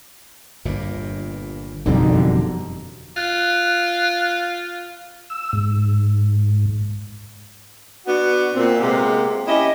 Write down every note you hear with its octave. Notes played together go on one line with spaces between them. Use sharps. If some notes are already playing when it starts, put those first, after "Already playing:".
G1 G2 A#2
F#1 F2 B2 D3 E3 G3 C4 D#4
F4 F#6
E6
G#2
B3 D4 F#4
A#2 C4
C3 G#3 A#3 B3 G4
C#4 E4 G4 D#5